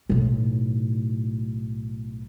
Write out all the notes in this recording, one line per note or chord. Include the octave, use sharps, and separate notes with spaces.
B1 A2